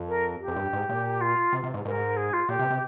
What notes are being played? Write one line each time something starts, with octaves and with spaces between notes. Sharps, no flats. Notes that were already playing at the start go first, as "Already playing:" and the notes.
Already playing: F2
A#4
G4
F2
G2
G#2
A#2
F4
C3
C3
G#2
G#2 A#4
G#4
F4
A#2 G4
C3
C3